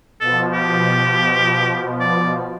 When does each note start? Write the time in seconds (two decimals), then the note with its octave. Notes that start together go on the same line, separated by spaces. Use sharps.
0.20 B2 F3 A4
0.53 G4
2.00 D5